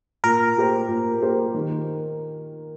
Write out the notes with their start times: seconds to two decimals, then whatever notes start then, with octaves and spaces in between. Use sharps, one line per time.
0.24 A#2 A#4
0.56 A#3 G4 C5
0.89 A#2
1.22 A#3 G4 C5
1.54 D#3